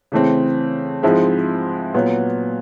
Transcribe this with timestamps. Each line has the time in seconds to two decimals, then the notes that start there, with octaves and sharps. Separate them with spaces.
0.12 C#3 E3 A3 C4
1.03 G#2 F3 G#3 C4 E4
1.94 A#2 F#3 B3